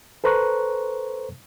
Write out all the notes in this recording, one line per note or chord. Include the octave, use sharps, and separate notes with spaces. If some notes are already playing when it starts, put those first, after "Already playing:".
A4 B4 C5 A#5 C#6 F#6